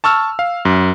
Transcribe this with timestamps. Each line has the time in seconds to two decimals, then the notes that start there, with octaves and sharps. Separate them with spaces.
0.04 A5 C#6 E6 F6
0.39 F5
0.65 F#2